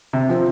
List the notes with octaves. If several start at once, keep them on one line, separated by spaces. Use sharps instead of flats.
C3
F3 C4